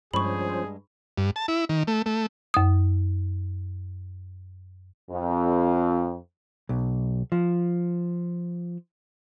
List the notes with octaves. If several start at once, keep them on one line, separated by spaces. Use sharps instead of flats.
G2 F3 G#3 C#4 G#4 C5 B5 C#6
G2
A5
E4
D#3
A3
A3
F#2 D#6
F2
B1
F3